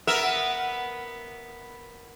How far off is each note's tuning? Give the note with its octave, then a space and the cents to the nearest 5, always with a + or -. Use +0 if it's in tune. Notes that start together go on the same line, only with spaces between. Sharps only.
B3 +0 A#4 +0 E5 +0